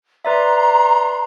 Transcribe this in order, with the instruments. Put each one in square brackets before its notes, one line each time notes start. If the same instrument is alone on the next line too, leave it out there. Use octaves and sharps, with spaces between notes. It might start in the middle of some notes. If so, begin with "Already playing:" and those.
[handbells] B4 D5 E5 [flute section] A#5 C6